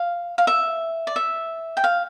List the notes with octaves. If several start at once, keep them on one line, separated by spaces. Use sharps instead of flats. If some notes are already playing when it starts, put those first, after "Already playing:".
Already playing: F5
F5
E5
D5
E5
G5
F5